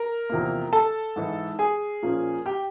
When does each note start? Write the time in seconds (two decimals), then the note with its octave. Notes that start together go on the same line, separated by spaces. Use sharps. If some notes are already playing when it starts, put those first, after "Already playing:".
Already playing: A#4 A#5
0.30 E2 C3 F3 A#3
0.73 A4 A5
1.16 G#2 E3 G#3
1.59 G#4 G#5
2.03 A#2 F3 A#3 C#4
2.46 G4 G5